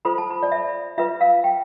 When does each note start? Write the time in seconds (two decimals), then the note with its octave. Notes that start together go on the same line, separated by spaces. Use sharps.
0.05 F4 A4 C5 B5
0.18 A5
0.30 B5
0.43 D5
0.52 E5
0.98 F4 B4 E5
1.21 F5
1.44 G5